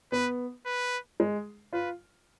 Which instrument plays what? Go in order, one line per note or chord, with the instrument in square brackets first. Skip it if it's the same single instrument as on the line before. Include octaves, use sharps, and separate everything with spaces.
[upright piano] B3 [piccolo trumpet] B4
[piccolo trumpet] B4
[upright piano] G#3
[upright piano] F4 [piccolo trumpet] B4